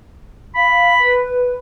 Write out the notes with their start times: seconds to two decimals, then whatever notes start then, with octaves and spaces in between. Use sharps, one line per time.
0.55 F5 B5
0.99 B4